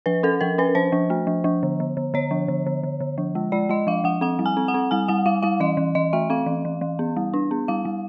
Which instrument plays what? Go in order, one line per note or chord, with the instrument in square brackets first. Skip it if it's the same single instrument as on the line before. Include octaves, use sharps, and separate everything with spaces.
[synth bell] F3 B4
C#4 A4
F3 A#4
C#4 B4
F3 C5
F3
A3
F3
F3
D3
D3
D3
D3 C#5
F3
D3
D3
D3
D3
F3
G#3
G#3 D5
G#3 D#5
F3 F5
F3 F#5
C4 F#5
G3
G#5
C4
F#5
C4
G3 G#5
G3 F#5
G3 F5
G3 F5
E3 D#5
E3
E3 D#5
A3 E5
C4 F5
E3
E3
E3
B3
G3
D4
B3
G3 F5
G3